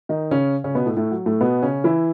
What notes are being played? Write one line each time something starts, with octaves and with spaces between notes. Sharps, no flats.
D#3 D#4
C#3 C#4
C#3 C#4
B2 B3
A2 A3
A2 A3
F#3
A2 A3
B2 B3
C#3 C#4
E3 E4